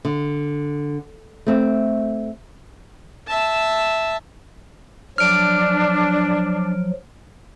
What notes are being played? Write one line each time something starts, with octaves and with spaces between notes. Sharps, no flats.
D3
A3 C4
E5 A5
F3 F#3 D4 F6 D7